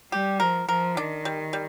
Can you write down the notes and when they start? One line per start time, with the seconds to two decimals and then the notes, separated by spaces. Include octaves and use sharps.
0.12 G3 G4
0.40 F3 A#4
0.69 F3 A#4
0.97 D#3 D4
1.25 G3
1.53 G3